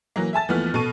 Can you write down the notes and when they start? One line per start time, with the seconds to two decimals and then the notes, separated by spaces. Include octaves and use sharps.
0.16 E3 F#3 A#3
0.33 E5 G#5 A5 A6
0.48 D#2 E3 F3 A3 B3 F6
0.74 B2 A4 C#6 D#7